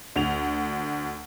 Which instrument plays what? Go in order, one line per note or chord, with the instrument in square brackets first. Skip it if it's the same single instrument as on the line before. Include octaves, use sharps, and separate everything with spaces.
[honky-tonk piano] D2 F7